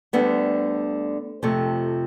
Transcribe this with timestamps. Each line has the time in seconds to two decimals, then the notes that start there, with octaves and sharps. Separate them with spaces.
0.13 D2 D3 G3 B3
1.43 F2 C3 F3 A3